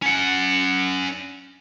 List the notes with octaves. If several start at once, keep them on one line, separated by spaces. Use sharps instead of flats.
C#4 F#5